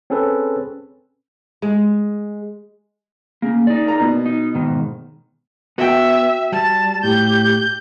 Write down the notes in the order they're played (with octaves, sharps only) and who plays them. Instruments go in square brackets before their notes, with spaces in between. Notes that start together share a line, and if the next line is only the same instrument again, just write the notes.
[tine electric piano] C4 C#4 G#4 A4 B4
[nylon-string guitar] G#3
[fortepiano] C#3 [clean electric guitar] A#3
[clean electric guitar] D#4 D5
[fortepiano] A#3 A#5
B2
[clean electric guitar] D#4
G#2 B2 D#3
[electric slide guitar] B3 [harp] F#4 G5 [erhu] E5
[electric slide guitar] G3 [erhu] A5
[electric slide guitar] A2 [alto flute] G4 [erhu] G6